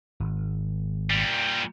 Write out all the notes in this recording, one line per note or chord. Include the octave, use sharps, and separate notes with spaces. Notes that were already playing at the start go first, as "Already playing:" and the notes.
G#1
A#2 G3